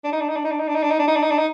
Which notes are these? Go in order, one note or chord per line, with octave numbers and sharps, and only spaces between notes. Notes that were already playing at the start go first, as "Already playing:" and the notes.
D4
D#4
D4
D#4
D4
D#4
D4
D#4
D4
D#4
D4
D#4
D4
D#4
D4
D#4
D4
D#4